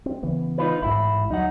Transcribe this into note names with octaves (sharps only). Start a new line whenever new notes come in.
C4
C#3 E3 B3
D#4 F4 B4
A1 G#2 E4
D2 F#3 D#4 F#5